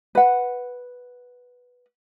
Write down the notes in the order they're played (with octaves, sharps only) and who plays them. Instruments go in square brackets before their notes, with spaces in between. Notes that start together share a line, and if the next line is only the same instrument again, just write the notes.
[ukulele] B4 F#5